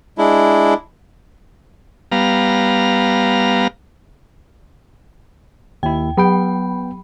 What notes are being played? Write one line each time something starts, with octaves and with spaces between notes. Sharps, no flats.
G#3 D4 E4
G3 B3 F5 A#5
D#2 E4 G5
F#3 B3 G5 B5